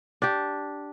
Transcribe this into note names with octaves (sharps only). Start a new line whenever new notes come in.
D4 G4